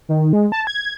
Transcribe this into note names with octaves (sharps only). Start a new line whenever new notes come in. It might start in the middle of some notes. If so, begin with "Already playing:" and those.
D#3
G#3
A5
G#6